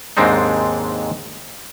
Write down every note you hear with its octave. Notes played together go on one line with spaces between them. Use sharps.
D#2 G#2 G#3 C4 D4 D#4